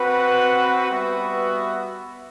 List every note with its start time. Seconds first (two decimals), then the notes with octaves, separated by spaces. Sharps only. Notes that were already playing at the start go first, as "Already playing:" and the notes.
Already playing: C4 F#4 B4 F#5
0.89 G3 B3 F#4 B4 E5